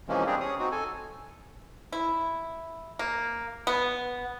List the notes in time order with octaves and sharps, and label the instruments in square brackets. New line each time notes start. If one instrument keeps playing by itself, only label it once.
[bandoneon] C3 E3 F3 G#3 A#3 C#4
G3 C4 D4 G4 G#4
C#4 G#4 C#5 D#6
C4 D#4 F#4
A4 G#5
[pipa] E4
A#3
B3